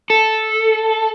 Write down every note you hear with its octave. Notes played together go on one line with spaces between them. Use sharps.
A4